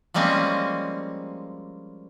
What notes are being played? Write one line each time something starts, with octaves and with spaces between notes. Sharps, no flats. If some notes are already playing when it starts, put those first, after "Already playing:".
F3 G3 G#3 A#3 C4 C#4